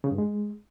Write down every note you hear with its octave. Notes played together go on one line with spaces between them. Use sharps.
C#3
G2
G#3